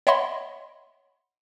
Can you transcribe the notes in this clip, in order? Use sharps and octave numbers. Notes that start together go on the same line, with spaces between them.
C#5 D#5 E5 F#5 B5 C6